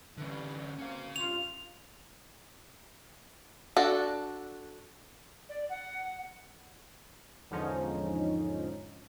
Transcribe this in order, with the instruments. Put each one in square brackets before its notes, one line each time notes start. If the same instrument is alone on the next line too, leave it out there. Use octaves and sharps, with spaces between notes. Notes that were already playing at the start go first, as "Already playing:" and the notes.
[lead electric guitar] D3 C#4 [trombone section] E3 G3
[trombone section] B2 A#3 C4 [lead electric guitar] C#4 F5
[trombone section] G2 F4 [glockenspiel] F7
[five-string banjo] D4 F#4 A4
[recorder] D5
F#5
[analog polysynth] E2 G#2 D3 F3 C#4 D#4